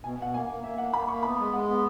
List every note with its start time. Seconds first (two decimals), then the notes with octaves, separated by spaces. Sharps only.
0.03 B2 G#5
0.18 B2 F#5
0.33 A#3 G#5
0.49 A#3
0.64 A#3 E5
0.78 A#3 F#5
0.93 A#3 B5
1.08 A#3 C#6
1.23 B3 B5
1.39 G#3
1.53 G#3 F#5
1.68 B3